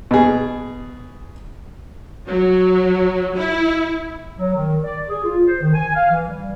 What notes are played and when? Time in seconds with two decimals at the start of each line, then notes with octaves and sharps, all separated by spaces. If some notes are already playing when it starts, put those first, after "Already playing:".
0.11 B2 G#4
2.27 F#3
3.36 E4
4.38 F#3
4.54 D#3
4.84 D5
5.09 G#4
5.24 F4
5.47 C5
5.62 D#3
5.74 G#5
5.95 F5
6.11 E3
6.27 G3